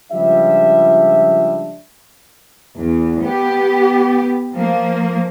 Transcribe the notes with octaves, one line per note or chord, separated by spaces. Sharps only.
C#2 F3 G3 D4 E5
E2
B3 G4
F3 A#3